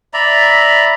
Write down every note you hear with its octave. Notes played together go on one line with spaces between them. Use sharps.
D5 E5 A#5 B5